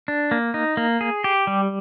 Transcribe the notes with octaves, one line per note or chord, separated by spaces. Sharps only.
D4
A#3
D#4
A#3
G#4
G4
G3